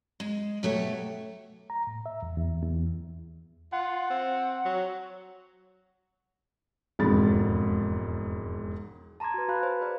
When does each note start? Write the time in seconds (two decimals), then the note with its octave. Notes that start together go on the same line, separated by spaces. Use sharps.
0.20 G#3
0.63 B2 F#3 A3 G4 C#5 E5
1.70 A#5
1.87 A2
2.06 E5
2.23 E2
2.37 E2
2.63 E2
3.72 F4 F#5
4.10 C4
4.65 F#3
6.99 E1 F2 G#2 B5 A6
9.20 A5 A#5 C6 D6 G#6
9.34 F#4 B4
9.48 F#4 F5 A5 B5 F#6
9.63 B4 C5
9.80 G#4 B4 D5